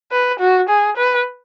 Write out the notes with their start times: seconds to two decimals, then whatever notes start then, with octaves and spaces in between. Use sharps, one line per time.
0.11 B4
0.40 F#4
0.69 G#4
0.97 B4